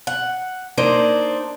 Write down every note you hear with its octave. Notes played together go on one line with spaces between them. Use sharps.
F#5
A#3 D4 D#4 C5